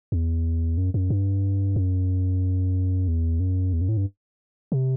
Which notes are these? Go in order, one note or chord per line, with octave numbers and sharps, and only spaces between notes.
E2
F#2
F#2
G2
F#2
E2
F#2
E2
F#2
A2
G2
C3